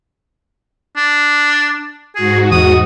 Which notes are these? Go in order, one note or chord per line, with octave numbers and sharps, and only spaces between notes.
D4
G#2 F#4 G#4
E2 D#6